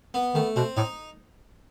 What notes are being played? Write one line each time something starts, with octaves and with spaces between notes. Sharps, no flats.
B3
D#3 A3
B2 C4
A2 D#4